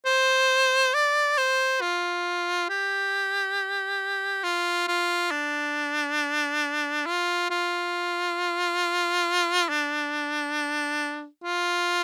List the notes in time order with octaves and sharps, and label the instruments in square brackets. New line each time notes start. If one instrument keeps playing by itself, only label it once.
[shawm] C5
D5
C5
F4
G4
F4
F4
D4
F4
F4
D4
F4